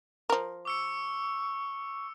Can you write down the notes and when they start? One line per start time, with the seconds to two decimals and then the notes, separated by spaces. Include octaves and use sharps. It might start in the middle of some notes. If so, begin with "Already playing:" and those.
0.30 F3 A#4
0.65 C#6 D6 E6 C#7